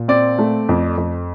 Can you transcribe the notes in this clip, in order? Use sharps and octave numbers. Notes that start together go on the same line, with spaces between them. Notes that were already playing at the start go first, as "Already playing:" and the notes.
Already playing: A#2
C4 D5
A3
F2
F2